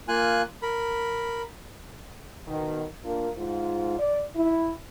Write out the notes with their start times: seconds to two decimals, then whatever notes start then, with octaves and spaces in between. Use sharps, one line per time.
0.08 A#3 F4 G#5 F#6
0.63 A#4 B5
2.46 B2 D#3
3.05 A#3 D4 F4 A#4
3.37 G#2 F4
3.99 D5
4.36 E4